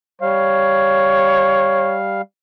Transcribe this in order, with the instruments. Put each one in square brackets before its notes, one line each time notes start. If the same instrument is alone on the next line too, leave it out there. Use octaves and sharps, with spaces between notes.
[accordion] G3 F5 [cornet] C#5